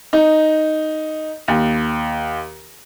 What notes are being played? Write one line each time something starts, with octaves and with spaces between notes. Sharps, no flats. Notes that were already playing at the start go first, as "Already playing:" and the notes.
D#4
D#2